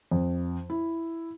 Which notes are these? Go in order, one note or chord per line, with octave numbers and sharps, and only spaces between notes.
F2
E4